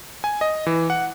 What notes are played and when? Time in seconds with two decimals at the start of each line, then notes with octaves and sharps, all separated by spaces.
0.24 G#5
0.41 D#5
0.67 E3
0.90 F#5